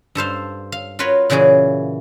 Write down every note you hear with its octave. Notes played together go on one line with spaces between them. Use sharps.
G2 A4 C5 F5
F5
F4 F#4 A#4 B4 C#5
A#2 C#3 E3 F#4 G#4